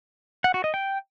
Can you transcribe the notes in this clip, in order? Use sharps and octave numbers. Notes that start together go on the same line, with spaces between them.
F#5
F#4
D#5
G5